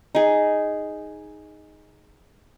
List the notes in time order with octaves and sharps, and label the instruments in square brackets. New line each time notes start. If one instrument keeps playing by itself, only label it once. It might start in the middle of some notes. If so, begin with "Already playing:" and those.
[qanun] D#4 G#4